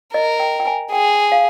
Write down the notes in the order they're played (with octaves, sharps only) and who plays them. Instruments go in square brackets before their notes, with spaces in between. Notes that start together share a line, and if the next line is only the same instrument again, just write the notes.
[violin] A#4 [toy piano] D#5
[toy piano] G5
G5
G#5
[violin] G#4 [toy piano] G5
[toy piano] F5